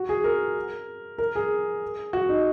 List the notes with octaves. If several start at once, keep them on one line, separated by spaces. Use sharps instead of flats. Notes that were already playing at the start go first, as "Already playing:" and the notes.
Already playing: F#4
G#4
A#4
A#4
G#4
F#4
D#4